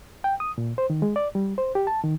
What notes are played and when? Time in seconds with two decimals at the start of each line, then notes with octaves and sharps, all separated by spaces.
0.24 G5
0.40 D#6
0.58 A#2
0.78 C5
0.90 D#3
1.02 G#3
1.16 D5
1.35 G3
1.58 C5
1.75 G4
1.87 A5
2.04 D#3